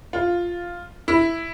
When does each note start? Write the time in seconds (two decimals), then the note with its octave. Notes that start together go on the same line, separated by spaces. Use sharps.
0.13 F4
1.08 E4